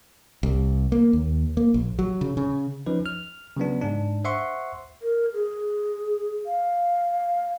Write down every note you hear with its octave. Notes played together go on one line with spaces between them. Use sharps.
C2
A#3
D#2
A#3
A#1
F#3
C#3
C#3
F3 C#4 D#4 B4
F6
C#3 F#3 B3 D4
G#2 D4
C5 E5 F#5 C6 C#6
A#4
G#4
F5